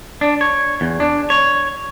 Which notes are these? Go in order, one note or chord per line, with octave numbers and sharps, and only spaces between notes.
D4
C#5
E2
D4
C#5